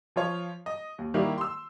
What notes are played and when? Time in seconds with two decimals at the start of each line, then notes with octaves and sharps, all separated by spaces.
0.16 F3 F4 C#5
0.66 D#5
0.98 D#2
1.14 D#3 G3 A#3 E4
1.38 C6 E6